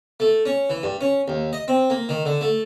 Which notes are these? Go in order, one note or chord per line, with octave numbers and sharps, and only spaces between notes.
A3
C#4
E3
G2
C#4
D#2
D#5
C4
A#3
D#3
D3
A3